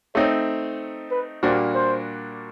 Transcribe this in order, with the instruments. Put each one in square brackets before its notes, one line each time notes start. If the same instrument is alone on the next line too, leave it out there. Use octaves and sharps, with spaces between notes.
[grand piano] A3 C4 D#4 [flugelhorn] C#5
[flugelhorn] B4
[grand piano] A#2 G3 A#3 D4 F#4 [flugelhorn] C5
[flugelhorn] C5